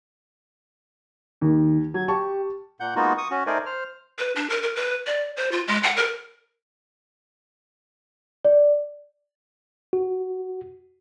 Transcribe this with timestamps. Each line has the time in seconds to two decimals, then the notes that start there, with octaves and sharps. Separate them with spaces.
1.41 D#2 D#3
1.94 F#3 G#6
2.08 G4 A5 C#6
2.80 A#2 F#5 G6
2.96 G#3 A#3 B3 D#4 F4 F#4
3.18 C#6 D#6
3.31 C#4 F#4
3.47 A3 D#4 A#4 C5 D5 G#5
3.66 C5 F6
4.19 B4
4.36 D4
4.50 A#4
4.63 A#4
4.76 B4
5.07 D5
5.37 C5
5.52 F4
5.68 G#3
5.83 F#5
5.97 A#4
8.45 D5
9.93 F#4